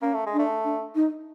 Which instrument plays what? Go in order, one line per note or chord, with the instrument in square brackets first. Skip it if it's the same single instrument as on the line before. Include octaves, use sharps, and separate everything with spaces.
[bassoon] A#3 [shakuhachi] C#4
[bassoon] A3
G#3
[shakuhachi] D4
[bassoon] A3
[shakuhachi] D4
D#4